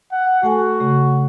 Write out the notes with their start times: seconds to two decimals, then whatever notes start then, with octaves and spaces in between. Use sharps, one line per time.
0.12 F#5
0.43 A3 F#4 A4 G#5
0.80 C#3 A3